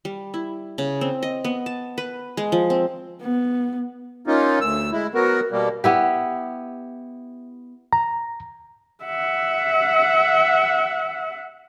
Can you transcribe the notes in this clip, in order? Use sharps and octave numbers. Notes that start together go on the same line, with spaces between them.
G3
E4
C#3
C4
D#5
B3
A5
B4
G#3
F3
C4
B3
A#3 C#4 D#4 F4
D2 E6
G#3 E4
F#3 B3 F#4 A#4
B2 G3 A#3
B3 E4 G4
A#5
E5 F#5